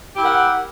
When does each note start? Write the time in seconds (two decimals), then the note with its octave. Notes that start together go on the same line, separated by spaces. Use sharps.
0.15 G4
0.18 E4
0.22 A#4
0.26 F#5